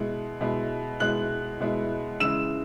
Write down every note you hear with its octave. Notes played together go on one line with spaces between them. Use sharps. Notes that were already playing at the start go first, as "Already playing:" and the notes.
Already playing: B2 G#3 E4
B2 G#3 E4
B2 G#3 E4 F#6 F#7
B2 G#3 E4
C#3 E3 G#3 E4 E6 E7